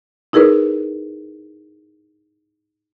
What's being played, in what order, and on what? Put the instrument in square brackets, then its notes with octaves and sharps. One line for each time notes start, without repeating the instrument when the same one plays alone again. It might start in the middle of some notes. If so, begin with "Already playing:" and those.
[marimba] D#4 E4 G#4 A#4 B4